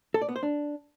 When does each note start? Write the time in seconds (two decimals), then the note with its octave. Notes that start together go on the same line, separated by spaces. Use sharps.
0.14 A4
0.21 D5
0.29 B3
0.36 C5
0.43 D4